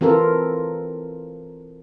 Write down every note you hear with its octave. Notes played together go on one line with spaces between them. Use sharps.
E3 C4 F4 A4 A#4